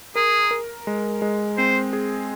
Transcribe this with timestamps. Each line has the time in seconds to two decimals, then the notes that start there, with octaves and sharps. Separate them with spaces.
0.15 G#4 A#4
0.51 A#4
0.87 G#3
1.22 G#3
1.57 C4 C5
1.93 G#4